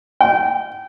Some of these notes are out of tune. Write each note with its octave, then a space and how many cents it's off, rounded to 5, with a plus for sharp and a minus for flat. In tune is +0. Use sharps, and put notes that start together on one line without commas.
G5 -25